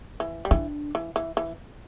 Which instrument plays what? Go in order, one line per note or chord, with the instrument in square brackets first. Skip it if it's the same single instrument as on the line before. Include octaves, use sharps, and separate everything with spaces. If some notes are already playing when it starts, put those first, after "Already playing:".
[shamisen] E3
G3
[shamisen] E3 [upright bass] D4
[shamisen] E3
E3
E3